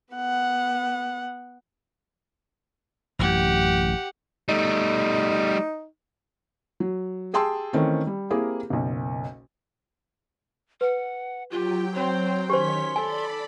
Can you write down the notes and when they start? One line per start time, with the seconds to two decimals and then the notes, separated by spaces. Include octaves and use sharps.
0.13 B3 F#5
3.19 A1 F#2 G4 F#5
4.48 G3 A3 D#4
6.80 F#3
7.33 G4 G#4 G5 A5 C6 E6
7.73 D#3 E3 A3 C4 C#4
8.07 G3
8.30 A#3 C4 E4 G4 G#4 A#4
8.70 F#1 B1
10.81 B4 F#5
11.51 F#3 F4 G4 G5
11.94 C4 C5 C#5
12.50 D#3 C#4 G4 C5 C#5 C6 B6
12.96 A4 D5 G#5 B5